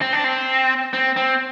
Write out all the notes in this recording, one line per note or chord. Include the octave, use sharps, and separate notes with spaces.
C4
D4
C4
C4
C4